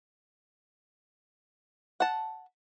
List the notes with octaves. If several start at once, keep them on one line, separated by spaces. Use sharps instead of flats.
F#5 A5